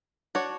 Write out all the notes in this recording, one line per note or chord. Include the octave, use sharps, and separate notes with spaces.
D4 F#4 C#5